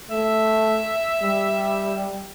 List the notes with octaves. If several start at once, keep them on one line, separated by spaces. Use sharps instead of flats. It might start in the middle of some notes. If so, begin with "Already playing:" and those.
A3 E5
G3